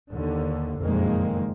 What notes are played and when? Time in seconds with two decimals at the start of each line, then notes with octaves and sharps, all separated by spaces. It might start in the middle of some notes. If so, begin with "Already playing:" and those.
0.12 D#2 D3
0.79 F#1 F2 A#2 D#3 G#3 A#3